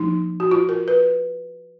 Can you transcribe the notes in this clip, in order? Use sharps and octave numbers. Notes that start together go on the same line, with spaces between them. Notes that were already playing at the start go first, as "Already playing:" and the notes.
Already playing: F3 A#3 D#4
F#4
F4
A#4
B4